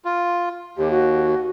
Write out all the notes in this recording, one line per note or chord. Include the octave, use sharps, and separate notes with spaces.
F4
D#2 G4
F#4